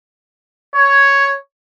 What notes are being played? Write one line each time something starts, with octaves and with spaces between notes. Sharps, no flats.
C#5